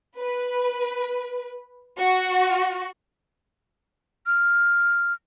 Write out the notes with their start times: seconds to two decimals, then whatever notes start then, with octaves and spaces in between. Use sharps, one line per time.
0.17 B4
1.97 F#4
4.27 F6